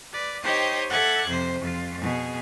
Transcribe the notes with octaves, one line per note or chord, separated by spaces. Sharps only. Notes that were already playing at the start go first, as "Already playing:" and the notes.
B4 D5
D#4 G4 C5 C#5 D#5 G5
A4 E5 F#5 D6 F#6 G#6
F2 C3 C5
F2 F4
B2 G#4